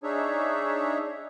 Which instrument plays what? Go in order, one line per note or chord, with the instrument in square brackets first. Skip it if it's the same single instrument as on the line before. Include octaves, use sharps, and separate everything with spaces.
[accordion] D4 D#4 G#4 C#5 E5